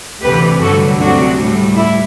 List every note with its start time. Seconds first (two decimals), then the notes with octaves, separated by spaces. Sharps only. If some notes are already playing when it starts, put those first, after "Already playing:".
0.23 D2 C3 E3 G4 B4
0.61 G2 D3 F#3 F#4 A4
0.99 D2 C3 F#3 D4 F#4
1.38 A2 G3
1.76 E4